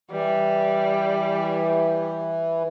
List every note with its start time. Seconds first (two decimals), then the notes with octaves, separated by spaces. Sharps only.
0.11 E3 G3